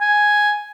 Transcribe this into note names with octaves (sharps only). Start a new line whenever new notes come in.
G#5